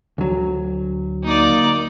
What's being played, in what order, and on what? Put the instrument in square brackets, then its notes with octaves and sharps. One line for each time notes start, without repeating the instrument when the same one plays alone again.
[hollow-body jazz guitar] D2 F#3
[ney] A#3 [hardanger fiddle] D#4 D5